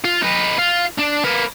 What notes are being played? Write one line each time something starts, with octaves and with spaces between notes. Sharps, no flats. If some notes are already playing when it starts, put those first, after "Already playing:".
F4
D#4 B4
F4
D4
A#3 B4